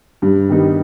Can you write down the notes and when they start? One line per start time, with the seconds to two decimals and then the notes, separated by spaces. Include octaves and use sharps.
0.22 G2
0.49 D#3 G3 B3 D#4